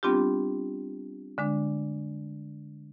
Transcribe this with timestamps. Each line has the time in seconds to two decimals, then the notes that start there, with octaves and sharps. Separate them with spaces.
0.03 G3 B3 C4 D4 F4 G4
1.38 D3 G#3 D4